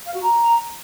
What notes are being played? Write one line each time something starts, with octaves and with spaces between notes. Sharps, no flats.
F5
F#4
A#5